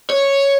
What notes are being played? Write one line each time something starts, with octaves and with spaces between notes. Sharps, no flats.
C#5